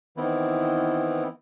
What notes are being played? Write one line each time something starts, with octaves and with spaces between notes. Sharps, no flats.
D#3 E3 B3 C4 E4